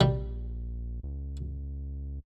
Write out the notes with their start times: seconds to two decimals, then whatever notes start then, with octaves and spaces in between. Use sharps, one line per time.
0.01 A#1 G3
1.03 C#2